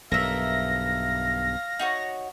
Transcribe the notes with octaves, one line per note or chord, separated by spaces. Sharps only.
B1 G2 A#4 E5 F5 A#6
D#4 F#4 C#5